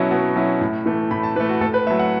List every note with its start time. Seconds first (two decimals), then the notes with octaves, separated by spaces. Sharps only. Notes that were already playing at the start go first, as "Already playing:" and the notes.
Already playing: B2 F#3 C#4 E4
0.11 B2
0.36 F#3 C#4 E4
0.61 A2
0.86 E3 A3
1.11 A2 B5
1.23 A5
1.36 E3 B4
1.40 A3
1.49 F#4
1.61 A2 A4
1.74 B4
1.87 A3 E5
1.91 F#3
1.99 F#5